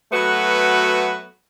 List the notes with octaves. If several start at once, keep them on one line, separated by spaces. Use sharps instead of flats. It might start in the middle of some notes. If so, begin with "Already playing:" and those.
F#3 A3 B3 F#4 B4